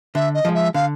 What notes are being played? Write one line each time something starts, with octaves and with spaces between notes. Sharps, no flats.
D3 E5
D#5
F3 G#3
E5
D3 F5